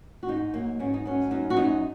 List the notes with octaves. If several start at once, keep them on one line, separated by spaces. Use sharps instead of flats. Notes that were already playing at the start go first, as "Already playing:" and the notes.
F#4
G#2 D#4
F#3 A#3
G#2 C#4
D#4
F#3 C#4
F#2 D#4
F#4
F#2 D#4